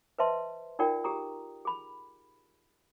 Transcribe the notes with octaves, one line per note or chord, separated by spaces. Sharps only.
B4 C5 D#5 E5 A5 C6
D#4 F4 A#4 D5 F#5 G5
G4 G#4 A#5 D#6
G#4 B5